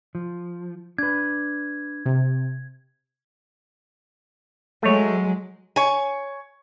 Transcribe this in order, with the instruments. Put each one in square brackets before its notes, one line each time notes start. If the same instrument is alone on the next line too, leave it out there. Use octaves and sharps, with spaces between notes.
[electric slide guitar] F3
[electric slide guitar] D4 B4 [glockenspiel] G#6
[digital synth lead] C3
[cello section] F#3 G#3 [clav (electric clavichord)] A3 C#5
[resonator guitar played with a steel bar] C#5 G#5